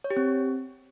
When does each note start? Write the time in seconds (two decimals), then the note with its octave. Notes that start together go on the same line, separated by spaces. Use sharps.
0.04 C#5
0.11 G4
0.17 C4